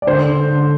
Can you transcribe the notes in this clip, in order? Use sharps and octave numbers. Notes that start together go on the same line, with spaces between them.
D5
D3 C5
D3
D3